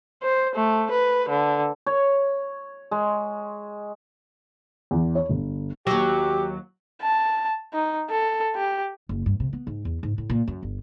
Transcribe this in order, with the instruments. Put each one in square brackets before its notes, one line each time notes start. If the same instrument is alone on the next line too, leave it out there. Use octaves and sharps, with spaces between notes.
[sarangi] C5
A3
B4
D3
[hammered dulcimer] C#5
G#3
[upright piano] E2
C#5
G1
[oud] D#2 F#3 [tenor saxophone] G4
[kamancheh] A5
D#4
A4
G4
[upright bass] F#1
G2
C3
B3
G#2
E2
G#2
A2
A#2
F#2
G1